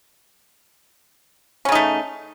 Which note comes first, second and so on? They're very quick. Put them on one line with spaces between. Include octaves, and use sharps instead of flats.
C#4 C#3 D#4 A3